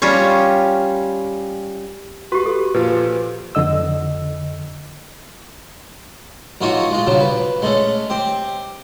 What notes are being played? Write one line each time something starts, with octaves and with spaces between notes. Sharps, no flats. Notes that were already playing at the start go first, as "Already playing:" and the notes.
G3 C#4 F4 C#5
F#4 G4 B4
A4
A#2 F3 F4 B4
F2 D3 D#5 E6
A1 D#4 F4 F#4 C#5 G#5
G#3 F4
G2 C#3 F3 F#3
B4
G#3 A3 C#4
C4 G4